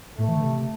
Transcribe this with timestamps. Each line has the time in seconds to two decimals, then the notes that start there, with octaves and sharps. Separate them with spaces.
0.18 A2 A3
0.28 E3
0.36 D3
0.44 C3